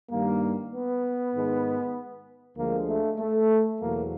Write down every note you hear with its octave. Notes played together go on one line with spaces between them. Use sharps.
G2 D#3 G3 A#3
B3
G#2 D#3 G#3
D2 D3 F3 G#3 A#3
A3
A3
E2 B2 F#3 A3 A#3